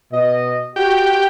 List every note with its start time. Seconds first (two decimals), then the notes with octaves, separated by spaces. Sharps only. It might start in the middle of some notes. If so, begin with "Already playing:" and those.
0.13 B2 D#5
0.76 F#4 G4